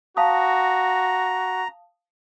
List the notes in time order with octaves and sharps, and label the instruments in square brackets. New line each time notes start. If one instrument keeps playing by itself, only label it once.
[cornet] F#4 [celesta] F5 A5 D#6 [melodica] A#5